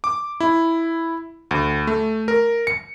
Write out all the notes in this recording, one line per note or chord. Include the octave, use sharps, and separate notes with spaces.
D6
E4
D2
A3
A#4
C#7